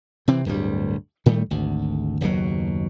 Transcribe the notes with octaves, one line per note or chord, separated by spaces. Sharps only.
C3 E3 C4
D1 D2 G2 G3
A2 D#3 G3 A3
G#1 D2
F#1 D#2 B2 F#3